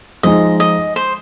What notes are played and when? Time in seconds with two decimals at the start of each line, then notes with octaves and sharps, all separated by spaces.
0.23 F3 G#3 D#4 D#5
0.60 D#5
0.96 C5